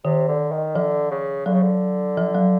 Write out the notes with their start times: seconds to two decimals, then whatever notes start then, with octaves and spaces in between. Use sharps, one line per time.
0.05 C3 D#3
0.28 D3
0.52 D#3
0.75 D3 F3
1.11 C#3
1.46 D3 F#3
1.54 C#3
1.62 D3
2.17 F3
2.35 F#3